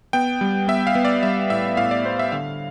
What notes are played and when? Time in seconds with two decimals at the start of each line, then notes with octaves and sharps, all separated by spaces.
0.13 B3 G5
0.41 G3
0.68 B3 E5
0.87 F5
0.95 B3
1.05 D5
1.23 G3 E5
1.50 A2 E5
1.77 A2 F5
1.91 D5
2.05 B3 C5
2.19 E5
2.32 D3 F5